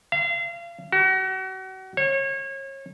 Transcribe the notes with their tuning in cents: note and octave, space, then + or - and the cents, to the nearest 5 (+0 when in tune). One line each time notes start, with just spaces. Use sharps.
F5 -35
F#4 +35
C#5 -30